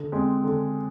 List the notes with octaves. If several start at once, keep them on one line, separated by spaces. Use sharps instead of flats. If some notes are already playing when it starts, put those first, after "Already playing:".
Already playing: D3
G#3 C4
D3